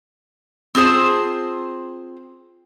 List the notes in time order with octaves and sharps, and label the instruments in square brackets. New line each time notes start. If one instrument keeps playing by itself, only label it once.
[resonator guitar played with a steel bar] C4 F4 G#4 C5 A5